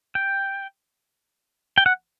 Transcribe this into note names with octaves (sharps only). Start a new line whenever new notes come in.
G5
G5
F#5